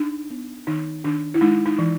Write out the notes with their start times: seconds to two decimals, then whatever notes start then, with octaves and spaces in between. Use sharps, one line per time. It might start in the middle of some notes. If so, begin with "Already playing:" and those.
Already playing: D4 D#4
0.30 B3
0.67 D#3 D#4
1.04 D#3 D4
1.34 E4
1.41 G#3 D#4
1.66 D#4
1.78 E3